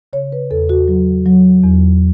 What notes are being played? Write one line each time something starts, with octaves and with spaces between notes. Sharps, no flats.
C#3 C#5
B4
E2 A4
F#4
F#3
F#3
E2